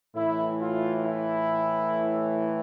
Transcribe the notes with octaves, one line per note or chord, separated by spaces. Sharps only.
A2 E3 E4
F4
E4